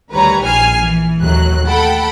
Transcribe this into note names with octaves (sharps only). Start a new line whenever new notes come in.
D2 D#3 G3 B4 C#5 A#5
A#1 G#5 F6 C7
E3
D#2 A2 F#3 F#6
A4 F#5 G5 B5